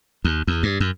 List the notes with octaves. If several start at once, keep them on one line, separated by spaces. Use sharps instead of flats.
D#2
E2
G2
F#2